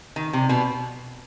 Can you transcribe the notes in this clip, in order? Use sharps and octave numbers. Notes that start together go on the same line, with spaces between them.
D#3
C3
B2 B3